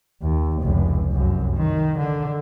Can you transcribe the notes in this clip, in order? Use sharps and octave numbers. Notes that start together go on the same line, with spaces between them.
D#2
F1 C#2
C2 F#2
D#3
D3